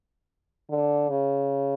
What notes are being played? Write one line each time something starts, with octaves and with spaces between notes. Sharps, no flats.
D3
C#3